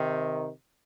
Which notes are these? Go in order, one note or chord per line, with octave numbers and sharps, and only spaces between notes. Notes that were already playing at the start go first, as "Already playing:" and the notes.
Already playing: C3 D#3